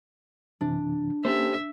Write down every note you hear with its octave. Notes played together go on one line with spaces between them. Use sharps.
F#2 C3 E3 D4
A#3 C#4 G4 A4 C5 E5